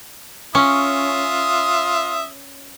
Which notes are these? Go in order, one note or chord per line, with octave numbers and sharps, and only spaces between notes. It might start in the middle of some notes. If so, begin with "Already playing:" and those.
C#4 F4 E5 D#6